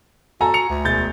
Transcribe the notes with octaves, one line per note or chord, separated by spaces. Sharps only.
F#4 A4 G#5 A#5
C#7 F7
D2
E1 G6 A6